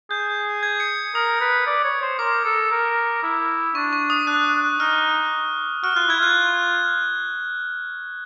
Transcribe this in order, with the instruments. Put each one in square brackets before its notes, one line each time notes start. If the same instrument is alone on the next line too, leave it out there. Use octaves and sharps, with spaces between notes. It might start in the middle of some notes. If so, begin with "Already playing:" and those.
[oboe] G#4 [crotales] G6
[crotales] G#6
C#7
[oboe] A#4 [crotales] D#6
[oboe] B4
D5
C#5
C5
[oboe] A#4 [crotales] D6
[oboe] A4
A#4
E4
[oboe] D4 [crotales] C#6
[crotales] C#6
D#6
[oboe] D4 [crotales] F#6
[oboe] D#4 [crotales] F6
[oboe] F#4 [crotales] F6
[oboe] F4 [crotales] F#6
[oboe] E4 [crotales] G#6
[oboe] F4 [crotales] F#6